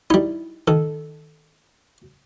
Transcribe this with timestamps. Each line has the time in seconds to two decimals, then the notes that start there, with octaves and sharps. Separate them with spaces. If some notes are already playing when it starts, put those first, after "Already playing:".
0.10 G3 D#4 E4
0.68 D#3 A4